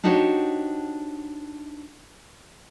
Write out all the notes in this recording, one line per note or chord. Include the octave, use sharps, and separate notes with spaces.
D4 D#4 F#4 G4 C5 C#5